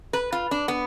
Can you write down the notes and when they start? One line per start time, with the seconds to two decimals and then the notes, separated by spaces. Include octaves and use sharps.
0.13 B4
0.32 F4
0.51 D4
0.68 B3